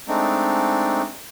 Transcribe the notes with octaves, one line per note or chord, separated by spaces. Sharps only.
G#3 A3 C4 D4 D#4